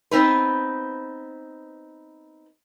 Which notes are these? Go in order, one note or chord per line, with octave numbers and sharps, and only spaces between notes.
B3 C4 D#4 B4